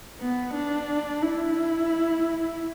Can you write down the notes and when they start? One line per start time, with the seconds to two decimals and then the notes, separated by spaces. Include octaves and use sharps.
0.20 B3
0.54 D4
1.22 E4